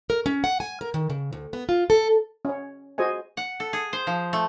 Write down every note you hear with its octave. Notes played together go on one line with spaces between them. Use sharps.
A#4
C#4
F#5
G#5
A#4
D#3
C#3
D2
B3
F4
A4
C#4 C#5
F#4 G#4 C5 D#5 G#5
F#5
A4
G#4
C5
F3
A3